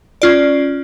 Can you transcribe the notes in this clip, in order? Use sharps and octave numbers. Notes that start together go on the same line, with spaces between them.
C#4 F4 D5